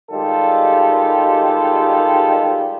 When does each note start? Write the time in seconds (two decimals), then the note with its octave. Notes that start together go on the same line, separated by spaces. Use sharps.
0.11 D#3 G3 G#3 F4 G4 A4